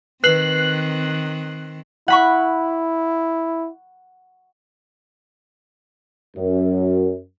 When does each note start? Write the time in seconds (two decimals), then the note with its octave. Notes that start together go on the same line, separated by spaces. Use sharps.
0.24 D#3 C4 B4 F#6 C7 F#7
2.08 E4 F#5 B5 C#6
6.37 F#2